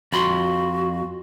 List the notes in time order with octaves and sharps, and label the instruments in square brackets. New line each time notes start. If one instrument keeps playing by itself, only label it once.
[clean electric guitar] F2 B5 C6 [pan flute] F#4